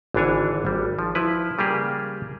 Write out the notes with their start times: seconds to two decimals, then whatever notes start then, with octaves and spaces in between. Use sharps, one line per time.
0.14 G#1 D3 E3 D4 C#5 G#5
0.65 G#1 G3
0.99 F3
1.15 F3 E4 B4
1.58 C#3 G3 A#3 G4 G#4